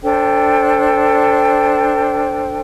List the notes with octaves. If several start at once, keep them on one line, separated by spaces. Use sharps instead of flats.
D4 A4 C5 G5